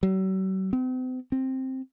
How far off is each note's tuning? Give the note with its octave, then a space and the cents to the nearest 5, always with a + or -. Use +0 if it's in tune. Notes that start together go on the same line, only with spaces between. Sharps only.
F#3 +45
C4 -40
C4 +5